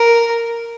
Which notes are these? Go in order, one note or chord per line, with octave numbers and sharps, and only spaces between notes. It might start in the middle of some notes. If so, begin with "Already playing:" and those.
Already playing: A#4